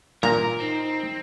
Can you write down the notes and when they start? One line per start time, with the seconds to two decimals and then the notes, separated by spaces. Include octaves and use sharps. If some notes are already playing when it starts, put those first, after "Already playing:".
0.23 A#2 A#4 A#5
0.60 C4 D#4